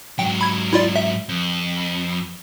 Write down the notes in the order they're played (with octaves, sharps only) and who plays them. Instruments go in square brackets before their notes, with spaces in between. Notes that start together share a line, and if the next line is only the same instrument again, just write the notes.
[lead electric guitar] G#2 F#3 [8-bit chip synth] G5
[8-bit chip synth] B5 G#6
E4 F4 D5
E5
[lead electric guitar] F2